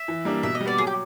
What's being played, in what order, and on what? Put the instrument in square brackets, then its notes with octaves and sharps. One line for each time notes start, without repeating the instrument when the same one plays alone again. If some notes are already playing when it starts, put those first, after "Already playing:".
Already playing: [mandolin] E5
[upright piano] E3
G3 A#3 D4
[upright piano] B2 [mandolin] E5
[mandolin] D#5
[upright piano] G3
[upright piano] B3 [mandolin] D5
[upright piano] F#3 [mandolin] G#4
[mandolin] G4